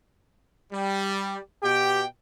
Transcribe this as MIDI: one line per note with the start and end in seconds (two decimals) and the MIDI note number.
0.72 1.39 55
1.63 2.05 47
1.63 2.03 67
1.63 2.05 79